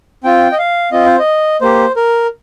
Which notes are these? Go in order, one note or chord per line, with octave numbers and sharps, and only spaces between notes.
C4 F4 G5
D#5
F5
C4 F4 D#5
C5
D#5
A#3 G4 C5
A#4